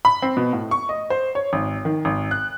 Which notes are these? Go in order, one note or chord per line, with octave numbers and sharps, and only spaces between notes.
B5
C4
B2
A2
C#6
D#5
C5
C#5
G#1
D#3
G#1
F#6